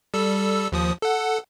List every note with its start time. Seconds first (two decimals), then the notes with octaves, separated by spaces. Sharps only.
0.14 G3 A4 E6
0.72 D#2 F3 D#6
1.02 A4 F#5